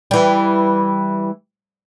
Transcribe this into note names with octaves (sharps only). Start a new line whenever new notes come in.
E3 G3